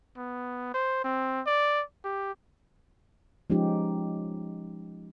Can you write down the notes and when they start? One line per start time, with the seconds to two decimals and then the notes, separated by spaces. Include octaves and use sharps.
0.17 B3
0.74 C5
1.04 C4
1.47 D5
2.05 G4
3.50 F3 G#3 C#4 D#4 G4